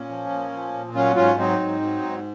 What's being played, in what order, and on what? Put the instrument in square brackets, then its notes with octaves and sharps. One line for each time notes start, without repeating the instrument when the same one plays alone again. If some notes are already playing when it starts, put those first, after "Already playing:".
Already playing: [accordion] A#2 A#3 C#4
F3
A#2
F3
A#2
F#3 C#4 F4
G#2 C#4 F4
F#3 C4 D#4
G#2
F#3
G#2